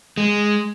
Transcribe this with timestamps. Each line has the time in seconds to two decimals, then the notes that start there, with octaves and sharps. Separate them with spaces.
0.17 G#3